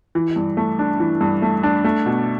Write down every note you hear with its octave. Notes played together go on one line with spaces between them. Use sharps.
E3
G2
A3
D4
E3
G2
A3
D4
A3
B2